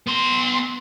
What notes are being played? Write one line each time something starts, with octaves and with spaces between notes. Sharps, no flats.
B3 C6